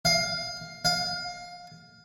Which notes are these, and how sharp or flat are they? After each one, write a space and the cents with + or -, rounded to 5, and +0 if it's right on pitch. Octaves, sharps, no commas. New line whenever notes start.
F5 +15
F5 +20